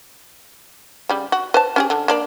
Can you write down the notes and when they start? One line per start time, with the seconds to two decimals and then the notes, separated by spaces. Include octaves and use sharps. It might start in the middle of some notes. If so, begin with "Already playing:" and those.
1.09 C#3 G3
1.32 F#4
1.54 B4 C5 A5
1.76 C#4 G4 G#4
1.90 D3
2.08 A#3 D4 D5